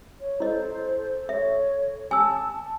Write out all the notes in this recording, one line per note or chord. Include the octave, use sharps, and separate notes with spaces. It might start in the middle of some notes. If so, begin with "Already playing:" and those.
C#5
E4 A4 C5 D#5
C#5 E5
G#5 A5 E6